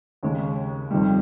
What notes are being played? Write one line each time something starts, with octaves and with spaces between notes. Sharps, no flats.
D#2 C#3 G#3 C#4
F2 C3 D#3 G3